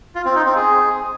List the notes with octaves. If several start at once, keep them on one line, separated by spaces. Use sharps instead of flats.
F4
C4
D#4
C4
G#4